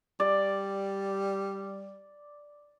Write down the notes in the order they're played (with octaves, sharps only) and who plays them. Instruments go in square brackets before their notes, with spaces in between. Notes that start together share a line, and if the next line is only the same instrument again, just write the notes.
[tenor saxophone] G3 [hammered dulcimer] D5